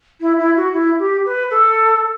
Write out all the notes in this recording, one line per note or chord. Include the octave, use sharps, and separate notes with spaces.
E4
E4
F#4
E4
G4
B4
A4